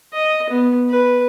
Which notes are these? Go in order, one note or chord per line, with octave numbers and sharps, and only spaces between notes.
D#5
B3
B4